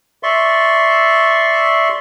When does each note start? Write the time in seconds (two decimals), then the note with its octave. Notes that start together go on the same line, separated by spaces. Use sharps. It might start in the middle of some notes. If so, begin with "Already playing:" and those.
0.23 D5 E5 C6 C#6